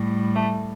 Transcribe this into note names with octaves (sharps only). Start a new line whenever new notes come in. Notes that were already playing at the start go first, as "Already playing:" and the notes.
Already playing: A2 G3
A3